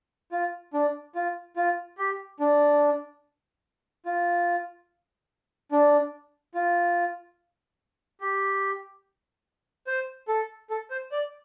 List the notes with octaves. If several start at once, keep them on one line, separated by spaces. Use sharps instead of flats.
F4
D4
F4
F4
G4
D4
F4
D4
F4
G4
C5
A4
A4
C5
D5